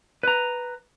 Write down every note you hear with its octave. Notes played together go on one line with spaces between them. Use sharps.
B4 A#5